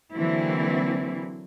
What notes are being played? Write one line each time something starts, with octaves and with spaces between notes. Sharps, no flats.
D3 E3 F#3 A#3 C4 E4